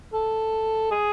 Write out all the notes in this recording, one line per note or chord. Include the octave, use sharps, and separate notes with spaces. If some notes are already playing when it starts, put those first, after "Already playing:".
A4
G#4